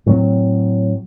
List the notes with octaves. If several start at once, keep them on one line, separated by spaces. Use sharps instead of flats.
A2 F#3 C4